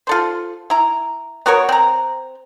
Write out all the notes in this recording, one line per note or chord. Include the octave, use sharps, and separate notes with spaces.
F4 A4 C5
E4 A#5
B3 F#4 A#4 C#5
C4 A#5